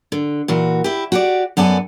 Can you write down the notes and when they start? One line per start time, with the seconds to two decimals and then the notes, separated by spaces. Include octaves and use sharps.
0.12 D3
0.48 A#2 E3 F#4
0.84 E4 G4
1.12 F#4 G4 D5
1.57 F#2 B3 A4 D5 G#5